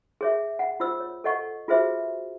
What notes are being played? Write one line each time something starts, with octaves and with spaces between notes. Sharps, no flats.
G#4 C#5 E5
F#5
F4 C5 E6
C#5
A4 C#5 D#5 F#5 C#6
F4 F#4 G#4 B4 C5 E5